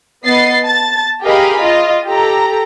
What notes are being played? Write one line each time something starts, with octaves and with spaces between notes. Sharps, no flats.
B3 D#5 A6 C7
A5 A6
G4 G#4 A#4 D#5 F5 B5
F4 D#5
G4 A4 A#5